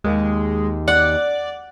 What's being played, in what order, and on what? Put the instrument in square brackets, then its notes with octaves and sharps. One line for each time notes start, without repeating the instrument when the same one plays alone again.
[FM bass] D#2 [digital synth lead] G#3
[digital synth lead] D5 [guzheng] F#5